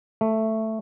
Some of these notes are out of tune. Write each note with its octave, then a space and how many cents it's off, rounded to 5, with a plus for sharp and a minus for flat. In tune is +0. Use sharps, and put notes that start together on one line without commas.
A3 +5